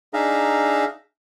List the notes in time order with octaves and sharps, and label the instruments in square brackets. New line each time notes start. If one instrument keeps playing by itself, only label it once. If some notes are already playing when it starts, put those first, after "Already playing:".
[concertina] D4 D#4 G#4 E5 F5 A#5